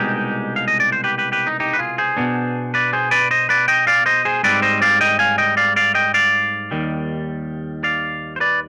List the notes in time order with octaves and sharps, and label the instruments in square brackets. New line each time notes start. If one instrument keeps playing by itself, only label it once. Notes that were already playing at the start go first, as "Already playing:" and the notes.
Already playing: [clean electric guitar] C2 B2 G#3 D#4 G4
F5
D#5
D5
C5
G4 B4
G4 B4
G4 B4
D#4
D#4 G4
B4
F4 G#4
G#4 C5
B2 B3 D4
B4 D5
G#4 C5
B4 D5
C5 D#5
B4 D5
D#5 G5
D5 F5
C5 D#5
G#4 C5
G#2 G3 C4 B4 D5
C5 D#5
D5 F5
D#5 G5
F5 G#5
D#5 G5
D5 F5
D5 F5
D#5 G5
D5 F5
D#2 D#3 G3
D5 F5
C5
B4 D5